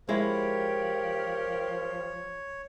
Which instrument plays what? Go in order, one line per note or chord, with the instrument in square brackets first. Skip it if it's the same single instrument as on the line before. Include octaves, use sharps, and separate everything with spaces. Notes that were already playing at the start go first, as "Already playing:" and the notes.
[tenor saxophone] F3 [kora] G#3 E4 [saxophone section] G4 A#4 [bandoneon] C#5